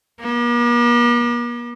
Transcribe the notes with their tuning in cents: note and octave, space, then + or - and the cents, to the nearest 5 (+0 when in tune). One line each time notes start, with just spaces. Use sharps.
A#3 +45